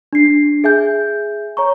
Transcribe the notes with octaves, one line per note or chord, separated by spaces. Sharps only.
D4 C7
G#4 E5 G#5 G6
C#5 A#5 C#6